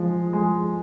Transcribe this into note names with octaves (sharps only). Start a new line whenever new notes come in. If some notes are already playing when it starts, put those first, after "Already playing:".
Already playing: F3 G#3
G#3